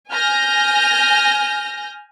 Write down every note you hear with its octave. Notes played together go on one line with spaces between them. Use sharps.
G#5 F6 G6 A#6